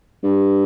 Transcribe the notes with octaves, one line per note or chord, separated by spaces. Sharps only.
G2